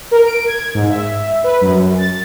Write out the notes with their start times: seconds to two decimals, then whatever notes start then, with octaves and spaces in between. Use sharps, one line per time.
0.11 A#4
0.25 D7
0.46 G#6
0.75 G#2
0.90 E5
1.44 B4
1.61 F#2
1.83 F#2
1.98 A6